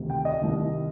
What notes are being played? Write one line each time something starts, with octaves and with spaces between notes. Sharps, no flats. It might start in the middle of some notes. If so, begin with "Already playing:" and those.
Already playing: D2 C3 D#3
G5
D#5
C2 C3 D#3